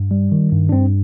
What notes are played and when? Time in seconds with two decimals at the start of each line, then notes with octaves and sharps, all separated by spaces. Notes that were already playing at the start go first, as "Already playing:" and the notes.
Already playing: G2
0.11 G3
0.32 D#3
0.52 G2
0.69 D4
0.72 G2 C4